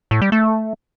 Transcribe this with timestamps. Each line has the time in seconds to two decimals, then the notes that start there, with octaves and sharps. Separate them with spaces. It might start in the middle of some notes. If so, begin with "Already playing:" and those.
0.11 A2
0.22 G3
0.32 A3